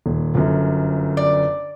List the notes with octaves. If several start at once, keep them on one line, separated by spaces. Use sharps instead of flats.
D#1
G1 F#2
D5